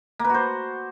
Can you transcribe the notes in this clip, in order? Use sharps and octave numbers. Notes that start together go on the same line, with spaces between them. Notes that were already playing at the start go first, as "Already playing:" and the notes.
A#3
B4
F#4
C5